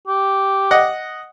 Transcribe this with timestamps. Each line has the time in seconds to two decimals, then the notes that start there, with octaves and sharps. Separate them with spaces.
0.08 G4
0.71 D#5 F#5